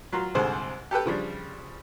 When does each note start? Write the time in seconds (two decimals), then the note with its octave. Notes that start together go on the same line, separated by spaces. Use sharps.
0.13 F#3 F4 A#5 C6
0.35 C2 G#2 D3 G#4 C5
0.91 G4 A4 B4 G5
1.06 C#3 F3 G3 D4